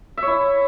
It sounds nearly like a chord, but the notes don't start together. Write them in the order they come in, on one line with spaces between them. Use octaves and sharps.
E5 C#5 E4